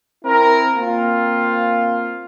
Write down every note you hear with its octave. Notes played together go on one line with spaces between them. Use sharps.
C4 E4 A#4
A#3 C4 F4